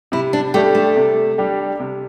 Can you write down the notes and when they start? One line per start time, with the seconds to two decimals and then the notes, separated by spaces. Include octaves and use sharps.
0.12 C3 E4
0.33 D4
0.54 G3 A3 D4 G4
0.75 A3
0.96 C3
1.38 G3 D4 G4
1.80 C3